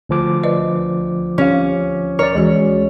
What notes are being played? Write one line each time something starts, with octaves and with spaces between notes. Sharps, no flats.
D2 F3 D6
B4 D5 D#5
C#4 G4 F5
A#4 C#5 D5
D2 E3 G#3 F#4